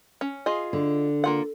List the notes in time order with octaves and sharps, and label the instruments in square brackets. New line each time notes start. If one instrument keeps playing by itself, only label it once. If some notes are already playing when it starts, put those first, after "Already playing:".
[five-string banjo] C#4
F4 G#4 D#5
[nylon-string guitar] D3
[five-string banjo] A#3 F4 F#5